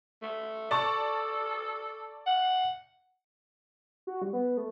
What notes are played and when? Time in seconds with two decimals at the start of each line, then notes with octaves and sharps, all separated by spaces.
0.22 A3
0.71 A4 D5 A5 C#6
2.26 F#5
4.07 F#4
4.22 G3
4.33 B3
4.57 A3